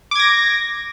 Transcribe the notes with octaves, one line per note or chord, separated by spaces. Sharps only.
D6 G#6 A#6